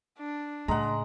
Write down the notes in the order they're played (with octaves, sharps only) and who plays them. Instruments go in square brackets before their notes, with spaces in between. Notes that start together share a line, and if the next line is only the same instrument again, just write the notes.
[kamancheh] D4
[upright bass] A2 C#3 [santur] G#3 F#5 [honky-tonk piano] A#5